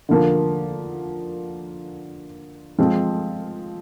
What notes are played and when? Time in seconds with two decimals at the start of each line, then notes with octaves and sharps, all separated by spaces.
0.09 D3 F3 A#3
2.79 F3 G#3 C4